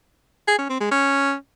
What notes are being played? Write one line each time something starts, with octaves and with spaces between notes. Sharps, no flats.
G#4
C#4
C4
G#3
C#4